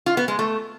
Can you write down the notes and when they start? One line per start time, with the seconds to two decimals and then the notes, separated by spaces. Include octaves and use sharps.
0.06 F4
0.17 B3
0.28 G#3
0.39 A3